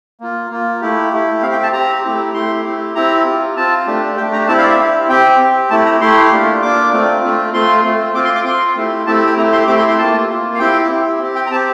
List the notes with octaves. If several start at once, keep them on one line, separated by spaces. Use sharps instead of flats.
A#3 F4
A#3 F4
A3 E4 G4
A3 E4 G4
C4 G4 F5
G5
A5
C4 G4 A#5
A3 E4 G4
A3 E4 G4 C6
C4 E4 G4
C4 E4 G4 A#5
C4 F4
C4 F4 A5
A3 D4 G4
A3 D4 G4 G5
A#5
C4 E4 G4 A5
F5
D5
E5
C4 E4 G4
C4 G4 G5
C4 G4
A3 E4 G4 A5
A#5
A3 E4 G4 C6
A#3 D4 F4
A#3 D4 F4 D6
A3 C4 F4
A3 C4 F4
A3 C4 F4 C6
A3 C4 F4
C4 F4 D6
C6
D6
C4 F4 C6
A3 C4 E4 G4
A3 C4 E4 G4 A5
G5
A3 C4 E4 G4 A#5
C6
A3 C4 E4 G4 D6
C6
C6
A#3 F4 A5
A#3 F4
F5
C4 E4 G4 G5
C4 E4 G4
C4 G4
G5
A#5
C4 G4 A5